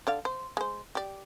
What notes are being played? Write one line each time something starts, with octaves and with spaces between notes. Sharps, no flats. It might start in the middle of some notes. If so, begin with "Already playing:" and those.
D3 D5 F5
C5
G#3 C5
G4 D5